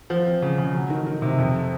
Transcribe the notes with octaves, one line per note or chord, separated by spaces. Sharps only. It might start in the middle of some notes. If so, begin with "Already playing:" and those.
F3
C4
C#3
C#3
F#3
D#3
D#3
C3
F2